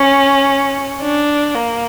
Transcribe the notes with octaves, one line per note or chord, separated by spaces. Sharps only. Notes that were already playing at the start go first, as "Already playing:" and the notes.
Already playing: C#4
D4
A#3